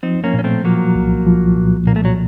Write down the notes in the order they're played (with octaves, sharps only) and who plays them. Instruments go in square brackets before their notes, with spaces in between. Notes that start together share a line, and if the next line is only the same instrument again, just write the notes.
[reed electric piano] F3 [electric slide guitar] C4 D#4
[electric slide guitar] A#3 C#4
[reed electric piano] A#2 [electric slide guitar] C#4
[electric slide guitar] A3 C4
[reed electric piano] F3 [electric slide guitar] F#3 A#3
[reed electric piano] C2
F3
A#2
[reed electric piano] A#2 [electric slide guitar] A#3
[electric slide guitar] A3
F#3